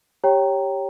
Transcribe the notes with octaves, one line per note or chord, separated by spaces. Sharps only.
G4 C#5 G5 A#5